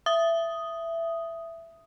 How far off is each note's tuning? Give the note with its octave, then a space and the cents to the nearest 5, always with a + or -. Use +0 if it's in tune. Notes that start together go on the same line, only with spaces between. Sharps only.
E5 +15 D#6 +0